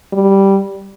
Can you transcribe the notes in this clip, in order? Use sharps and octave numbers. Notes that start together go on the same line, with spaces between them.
G3